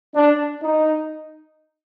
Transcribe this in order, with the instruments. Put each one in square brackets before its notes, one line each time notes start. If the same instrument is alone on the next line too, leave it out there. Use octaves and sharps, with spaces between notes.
[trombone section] D4
D#4